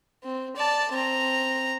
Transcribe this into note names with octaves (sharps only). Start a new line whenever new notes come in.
C4
D5 A5
C4 A#5